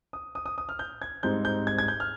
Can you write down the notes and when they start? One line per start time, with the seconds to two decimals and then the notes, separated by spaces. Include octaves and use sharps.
0.13 D#6
0.35 D#6
0.46 D#6
0.58 D#6
0.69 F6
0.79 G6
1.02 G#6
1.23 G#2 G3 C4 D#4 G6
1.45 G6
1.67 G#6
1.78 G#6
1.88 G6
2.00 F6